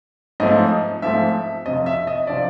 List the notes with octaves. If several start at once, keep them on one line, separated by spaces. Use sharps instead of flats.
G#2 F3 A3 C4 D#5
G#2 F3 A3 C4 E5
F2 C3 F3 D#5
E5
D#5
C3 F3 D5